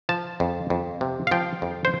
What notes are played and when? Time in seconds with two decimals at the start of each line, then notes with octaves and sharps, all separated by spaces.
0.09 F3 A5
0.40 F2
0.70 F2
1.01 C3
1.27 F5
1.31 F3 G5
1.62 F2
1.85 C5